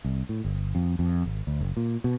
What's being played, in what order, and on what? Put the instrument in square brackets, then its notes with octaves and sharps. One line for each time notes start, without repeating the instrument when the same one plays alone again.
[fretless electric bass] C2
A2
G1
F2
F2
G#1
D2
F#1
A#2
B2